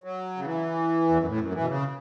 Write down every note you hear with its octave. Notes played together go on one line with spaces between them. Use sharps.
F#3
C#3
E3
E2
F#2
A2
F#2
E3
B2
C#3